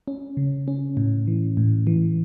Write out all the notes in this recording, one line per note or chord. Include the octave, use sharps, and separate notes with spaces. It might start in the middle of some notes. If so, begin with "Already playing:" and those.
C#4
C#3
C#4
A2
E3
A2
E3